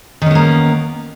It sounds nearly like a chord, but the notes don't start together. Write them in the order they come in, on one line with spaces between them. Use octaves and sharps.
D#3 C#4 B3 A#3